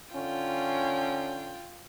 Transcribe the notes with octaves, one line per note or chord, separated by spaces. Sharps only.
D3 C#4 F4 G5